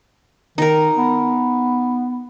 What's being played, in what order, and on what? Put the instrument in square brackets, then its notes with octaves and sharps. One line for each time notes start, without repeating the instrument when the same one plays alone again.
[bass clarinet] D#3 [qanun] D#4 A#4
[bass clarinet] B3